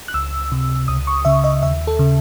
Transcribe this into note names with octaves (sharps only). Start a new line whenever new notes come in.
F#6
C#2 E6
C3
C#2 D#6
C#6
C#3 E5
D#5
D#2 E5
A4
C#3